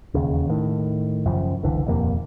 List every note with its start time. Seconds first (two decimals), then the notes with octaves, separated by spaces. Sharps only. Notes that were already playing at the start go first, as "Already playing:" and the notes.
0.14 E1 A1 D#2 C#3
0.50 A2 D#3
1.26 F#1 F#2 C#3 F3
1.63 F#1 C2 D3 E3
1.86 D#1 F2 C3 A#3